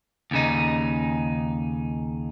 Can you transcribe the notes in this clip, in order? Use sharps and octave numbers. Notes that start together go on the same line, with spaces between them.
D#2 C#3 D#4